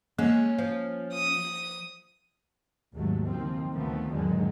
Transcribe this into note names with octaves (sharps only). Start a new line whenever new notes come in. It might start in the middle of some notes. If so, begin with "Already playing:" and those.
G#3 A#3 C#4
F3
D#6
G#1 D#2 F#3 G#3 A3
F#1 D#3 F3 C4
D2 D#3 F3 A3 B3
E2 G#2 D3 D#3 F#3 G#3